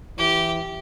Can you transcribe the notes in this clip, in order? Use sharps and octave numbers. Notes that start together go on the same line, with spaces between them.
E3 G4